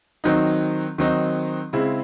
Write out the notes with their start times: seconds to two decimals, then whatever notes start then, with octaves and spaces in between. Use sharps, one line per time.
0.24 D#3 F#3 C4 D#4
0.98 D#3 F#3 C4 D#4
1.73 C#3 G#3 C4 E4